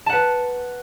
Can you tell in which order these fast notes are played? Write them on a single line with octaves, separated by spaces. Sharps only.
A5 F#5 B4